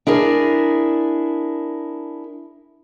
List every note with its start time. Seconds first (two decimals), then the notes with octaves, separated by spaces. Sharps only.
0.07 D4 E4 G#4 A#4